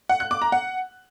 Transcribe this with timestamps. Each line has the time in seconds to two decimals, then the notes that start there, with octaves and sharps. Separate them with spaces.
0.09 F#5
0.20 F#6
0.31 D6
0.42 A#5
0.52 F#5